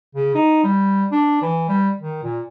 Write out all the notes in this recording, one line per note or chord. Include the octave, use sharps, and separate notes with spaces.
C#3
D#4
G3
D4
E3
G3
D#3
A#2